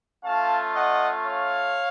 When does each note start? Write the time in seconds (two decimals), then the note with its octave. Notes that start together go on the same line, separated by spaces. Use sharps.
0.24 A3 C#4 F4 F5 A5
0.74 D#5 F#5
1.24 C#5 F5